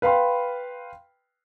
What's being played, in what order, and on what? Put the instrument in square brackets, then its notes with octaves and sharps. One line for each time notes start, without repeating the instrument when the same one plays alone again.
[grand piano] B4 F5 G5 B5 C6